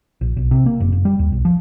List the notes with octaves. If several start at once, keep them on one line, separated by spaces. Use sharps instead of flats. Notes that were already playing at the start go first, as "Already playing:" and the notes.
A#1
B1
C3
A#3
F#1
F#1
G3
D#2
B1
F3